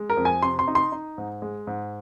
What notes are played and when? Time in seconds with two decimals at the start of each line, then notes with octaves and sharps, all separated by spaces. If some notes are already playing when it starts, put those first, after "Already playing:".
Already playing: G#3
0.10 A#4
0.17 F2
0.25 G#5
0.43 C3 C6
0.59 C6
0.68 D#4
0.75 C6
0.92 D#4
1.18 G#2
1.42 G#3
1.67 G#2